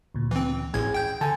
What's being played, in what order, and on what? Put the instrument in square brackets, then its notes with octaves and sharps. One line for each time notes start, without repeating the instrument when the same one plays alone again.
[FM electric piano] D2 A#2
[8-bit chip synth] E3 C4
[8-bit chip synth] A1 A2 G#6 [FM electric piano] G#4
[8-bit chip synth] G5 G6
[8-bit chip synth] D3 [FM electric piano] G#5 A5